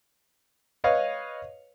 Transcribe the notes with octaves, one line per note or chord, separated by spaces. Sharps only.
B4 C#5 D#5 F5